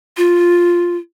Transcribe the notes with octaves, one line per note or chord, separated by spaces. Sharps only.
F4